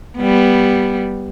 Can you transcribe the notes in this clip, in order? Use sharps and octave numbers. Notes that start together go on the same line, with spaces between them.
G3 B3